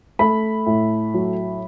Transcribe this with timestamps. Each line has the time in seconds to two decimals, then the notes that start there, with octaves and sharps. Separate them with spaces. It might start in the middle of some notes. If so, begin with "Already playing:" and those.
0.19 A3 B5
0.66 A2
1.14 F#3